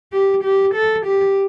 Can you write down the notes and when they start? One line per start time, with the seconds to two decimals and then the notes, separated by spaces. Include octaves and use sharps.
0.13 G4
0.44 G4
0.74 A4
1.06 G4